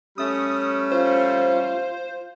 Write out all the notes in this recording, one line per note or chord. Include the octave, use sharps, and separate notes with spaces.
G3 A3 C#4 D#6
F4 C5